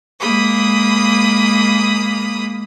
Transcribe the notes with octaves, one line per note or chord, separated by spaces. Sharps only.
G#3 A#3 B5 D#6